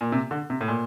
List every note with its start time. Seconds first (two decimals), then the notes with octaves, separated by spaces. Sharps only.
0.01 A#2
0.12 C3
0.31 D3
0.50 C3
0.61 A2
0.68 A#2